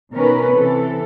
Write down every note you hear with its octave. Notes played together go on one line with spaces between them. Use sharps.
B2 D#3 C#4 A#4 B4
C3 E3 A4